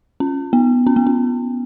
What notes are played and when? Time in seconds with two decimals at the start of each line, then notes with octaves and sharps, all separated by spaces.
0.20 C#4
0.53 B3
0.87 C#4
0.96 B3
1.07 C#4